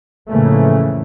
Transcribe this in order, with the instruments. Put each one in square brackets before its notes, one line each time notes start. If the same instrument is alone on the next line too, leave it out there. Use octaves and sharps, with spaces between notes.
[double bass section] F2 A2 C#3 E3 A3 A#3